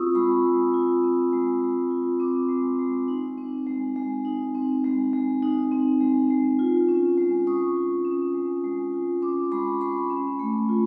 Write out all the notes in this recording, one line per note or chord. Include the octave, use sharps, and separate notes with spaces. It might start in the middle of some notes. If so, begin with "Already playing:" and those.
Already playing: C4 F4 C#6 D#6 E6
G#3 B5 C#6
G#3
F4
C4
G#3
G#3
F4
C4 C6 D6
G#3
G#3
D#4
C4
G#3
G#3
D#4
C4
G#3
G#3
D#4
C4
G#3
G#3
F4
C#4
G#3
G#3 C#6 D#6
F4
C#4
G#3
G#3
F4
C#4 C6 D6
G#3 B5 C#6
G#3 B5 C#6
C#4
A3
F4